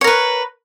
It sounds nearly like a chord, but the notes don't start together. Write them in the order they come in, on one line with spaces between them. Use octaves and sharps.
C#5 A#4 B4